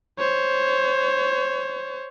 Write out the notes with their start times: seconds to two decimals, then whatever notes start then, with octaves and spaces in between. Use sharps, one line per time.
0.19 C5 C#5